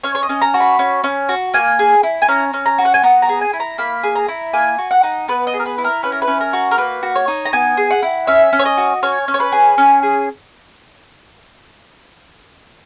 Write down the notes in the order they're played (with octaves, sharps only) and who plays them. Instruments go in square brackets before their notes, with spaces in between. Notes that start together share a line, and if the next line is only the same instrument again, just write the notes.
[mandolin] C#4 C#5
C#5
D#5
C#4
A#5
F#4
B5
C#4
C#4
F#4
A#3 G#5
G#4
E4
G#5
C#4 A#5
C#4
A#5
F#4
F#5
G#5
B3 A#5
A#5
G#4
G#5
E4
A#5
A#3 B5
G#4
A#5
E4
A#3 G#5
F#4
F#5
D#4
B3 B4
D#5
G#4
A#4
B4
E4
A#4
C#4 B4
A#4
B4
C#4
A#4
F#4
A#4
A#3 B4
F#4
C#5
D#4
A#5
B3 G#5
G#4
F#5
E4
C#4 E5
C#4
C#5
D#5
F#4
C#4 C#5
C#4
C#5
B4
G#4
C#4
G#4